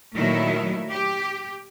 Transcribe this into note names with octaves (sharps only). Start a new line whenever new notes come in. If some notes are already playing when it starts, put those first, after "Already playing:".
A#2 D#3 F#3 A3 E4
G4